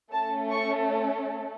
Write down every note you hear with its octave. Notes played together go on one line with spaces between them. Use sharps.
A3 C#4 A4 A5
C#6